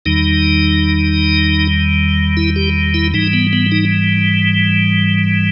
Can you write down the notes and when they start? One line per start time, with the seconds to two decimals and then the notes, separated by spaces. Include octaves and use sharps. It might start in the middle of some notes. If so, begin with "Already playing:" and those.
0.06 E2 D#3 G3 D#4
2.37 E4
2.56 G4
2.94 E4
3.14 G#2 E3 G3 D#4
3.33 B3
3.53 B3
3.72 D#4